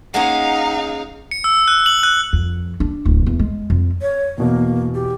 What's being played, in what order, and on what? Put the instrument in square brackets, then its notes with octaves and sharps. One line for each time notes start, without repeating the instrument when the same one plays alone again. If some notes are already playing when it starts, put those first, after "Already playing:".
[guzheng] G#3 A#3 C#4 [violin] D#4 F5 [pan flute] F#5
[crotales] C#7
E6
F#6
F#7
F#6
[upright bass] F2
D4
D1
E2
G#3
F2
[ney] C#5
[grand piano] E2 B2 [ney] A#3
[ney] G4